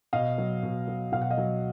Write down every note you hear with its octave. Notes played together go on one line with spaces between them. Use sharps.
B2 D#5 F5
F#3
B2
F#3
B2 F5
F#5
D#5 F5
F#3